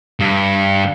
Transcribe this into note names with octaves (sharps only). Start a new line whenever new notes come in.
G2